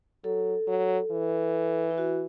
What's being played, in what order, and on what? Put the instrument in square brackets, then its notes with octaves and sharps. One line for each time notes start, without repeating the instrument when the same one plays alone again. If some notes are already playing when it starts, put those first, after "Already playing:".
[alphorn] F#3 [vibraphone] A4
[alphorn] F#3
E3
[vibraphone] E4
F#4